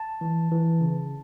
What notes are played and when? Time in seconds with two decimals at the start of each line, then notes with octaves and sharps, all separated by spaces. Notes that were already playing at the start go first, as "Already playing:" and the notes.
Already playing: A5
0.21 E3
0.51 E3
0.81 C#3